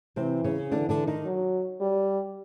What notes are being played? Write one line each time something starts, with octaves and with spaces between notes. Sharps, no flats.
C3 E3 C4
C#3 C#4
D3 E3 D4
D3 D4
D#3 D#4
F#3
G3